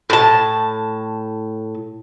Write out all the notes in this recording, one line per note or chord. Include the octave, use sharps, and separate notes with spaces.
A2 A5